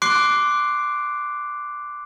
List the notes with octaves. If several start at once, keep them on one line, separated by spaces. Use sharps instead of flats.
C6 D6 F#6 C7 D7